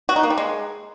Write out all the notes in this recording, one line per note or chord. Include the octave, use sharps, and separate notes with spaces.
F#4
D#4
A#3
G3
G#3